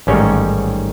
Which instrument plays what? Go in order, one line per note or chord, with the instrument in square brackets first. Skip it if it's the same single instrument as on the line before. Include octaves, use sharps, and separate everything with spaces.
[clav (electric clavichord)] A1 G#2 D#3 G3 C#4 C#5